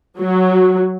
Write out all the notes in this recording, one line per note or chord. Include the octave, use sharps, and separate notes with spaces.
F#3